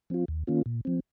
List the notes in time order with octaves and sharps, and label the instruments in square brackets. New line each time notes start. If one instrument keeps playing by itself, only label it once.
[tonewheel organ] F3 C4 F4
D#2
D#3 A#3 C#4 F4
A#2
F3 C4